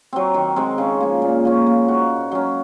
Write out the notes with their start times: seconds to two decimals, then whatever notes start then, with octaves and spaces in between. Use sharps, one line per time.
0.13 F#3 C4
0.34 D#3
0.56 G#3 C4 D#4
0.78 C#3
1.00 F3 A#3
1.22 A#2
1.45 F3 A#3 C#4
1.66 A#3
1.88 D#4 F#4
2.10 G#2
2.31 F#3 C#4